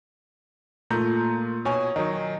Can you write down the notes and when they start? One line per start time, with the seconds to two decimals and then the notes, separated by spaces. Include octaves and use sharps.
0.90 A#2 A3 A#5 G6
1.65 B2 C#5 G#5
1.96 D#3 F#3 D#4